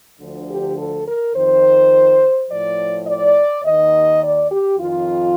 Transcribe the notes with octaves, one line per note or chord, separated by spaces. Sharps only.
D2 D3 F3
G4
A4
A#4
F2 D#3 C5
A2 F3 D5
D5
D#2 D#3 D#5
D5
G4
F2 D#3 F4